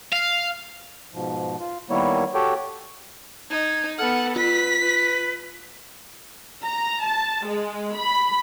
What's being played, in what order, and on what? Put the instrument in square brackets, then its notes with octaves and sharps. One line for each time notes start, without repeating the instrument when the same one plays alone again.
[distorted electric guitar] F5
[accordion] G#2 B2 F3
F4
D#3 G3 A#3 B3 E4 C#5
F#4 G4 A4 C#5 G5
[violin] D#4 [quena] G#6
[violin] B3 F#5 [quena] A4 [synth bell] F6
[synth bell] F4 [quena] B4 [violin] B6
[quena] B4
[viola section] A#5
A5
G#3
B5